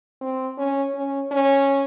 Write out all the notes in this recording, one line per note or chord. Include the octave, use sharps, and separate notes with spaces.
C4
C#4
C#4
C#4